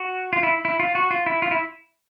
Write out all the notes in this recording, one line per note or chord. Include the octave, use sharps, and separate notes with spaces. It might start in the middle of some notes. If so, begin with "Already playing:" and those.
Already playing: F#4
F4
E4
E4
F4
F#4
F4
E4
F4
E4